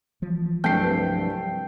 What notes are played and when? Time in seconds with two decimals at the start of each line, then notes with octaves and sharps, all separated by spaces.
0.22 E3 F3
0.64 C2 G2 F3 F#3 A3 C4 G5 C7